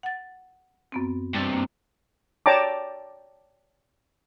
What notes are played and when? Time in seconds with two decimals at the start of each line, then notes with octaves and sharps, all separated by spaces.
0.03 F#5 A6
0.92 F#2 B3 C4
1.35 G2 C3 A6
1.53 A#3
2.46 C#5 D5 G5 A5 A#5 D6